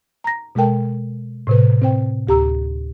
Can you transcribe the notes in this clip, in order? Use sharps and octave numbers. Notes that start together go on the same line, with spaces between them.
A#5 A#6
B2 G#3 A4 A#4 G5 A5
A2 C3 B4
C4 C5 G5
D2 G4 A#5 E6